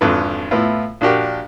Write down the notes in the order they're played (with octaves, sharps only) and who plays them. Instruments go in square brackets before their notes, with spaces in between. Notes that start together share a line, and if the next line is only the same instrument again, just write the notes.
[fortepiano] G#1 F2 D3 B4
A2 B3 E4 F4
A#1 D4 F#4 G4 A#4